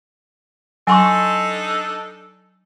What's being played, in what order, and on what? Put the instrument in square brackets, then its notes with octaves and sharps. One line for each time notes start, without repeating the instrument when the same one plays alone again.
[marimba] F#3 [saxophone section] D4 D#4 A4 [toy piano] G#5 C6 C#6